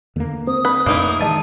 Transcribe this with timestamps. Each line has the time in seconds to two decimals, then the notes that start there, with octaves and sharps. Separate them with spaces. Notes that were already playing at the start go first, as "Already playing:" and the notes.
0.16 E2 D3 A#3
0.47 C4 D#6
0.65 B4
0.86 F2 A2 C3 A#3 D#4 E4
1.19 D#3 E3 G#3 A5 D#7